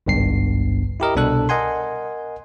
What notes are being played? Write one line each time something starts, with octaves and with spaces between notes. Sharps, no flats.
G#1 C#2 G2 B3 C7
E4 G4 A#4 D#5
C2 B2 D4 A4 F#6
A#4 D#5 F#5 G#5 C6